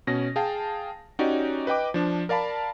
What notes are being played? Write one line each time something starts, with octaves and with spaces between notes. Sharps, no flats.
B2 C#4 A#6
G#4 F5 G5 A5
C#4 D#4 F#4 G4 D5
B4 D#5 G5 D6
F3 D4
A#4 D5 F5 A5 B5